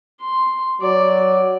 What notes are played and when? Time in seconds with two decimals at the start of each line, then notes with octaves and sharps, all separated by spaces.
0.21 C6
0.82 F#3 D5